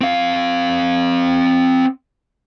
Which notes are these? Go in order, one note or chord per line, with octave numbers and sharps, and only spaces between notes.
C4 F5